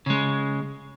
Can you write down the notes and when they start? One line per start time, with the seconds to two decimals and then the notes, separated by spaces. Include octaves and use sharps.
0.06 C#3 G#3